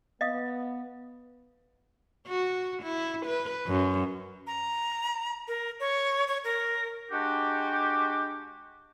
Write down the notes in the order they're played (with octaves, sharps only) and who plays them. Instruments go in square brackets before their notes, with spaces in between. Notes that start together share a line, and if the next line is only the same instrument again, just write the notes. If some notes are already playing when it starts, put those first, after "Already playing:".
[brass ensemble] B3 [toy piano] D#5 F5 D#6
[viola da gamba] F#4
E4
B4
F#2
[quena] A#5
A#4
C#5
C#5
A#4
[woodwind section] G#3 D4 F#4 G4